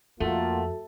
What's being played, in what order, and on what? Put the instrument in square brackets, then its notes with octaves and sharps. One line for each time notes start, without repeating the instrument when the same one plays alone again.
[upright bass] F2 [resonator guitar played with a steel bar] A3 [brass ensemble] A#3 F4 F#5 [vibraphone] F#4 A4